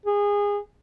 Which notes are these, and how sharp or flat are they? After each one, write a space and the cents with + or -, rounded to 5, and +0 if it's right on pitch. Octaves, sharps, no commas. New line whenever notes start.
G#4 -25